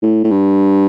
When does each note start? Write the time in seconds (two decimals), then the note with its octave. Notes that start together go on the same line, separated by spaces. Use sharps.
0.02 A2
0.24 A2
0.31 G2